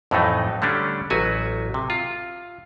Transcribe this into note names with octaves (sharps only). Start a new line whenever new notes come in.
F2 A2 E3 F#3 A3 D#4
D3 G3 A3 C#4 D4
A1 F#3 F#4 B4 G#5
C3
F4